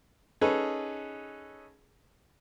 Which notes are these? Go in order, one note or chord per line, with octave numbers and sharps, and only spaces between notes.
C#4 D#4 G#4 A4 B4